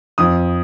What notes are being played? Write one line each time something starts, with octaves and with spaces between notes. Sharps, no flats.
F2 D#6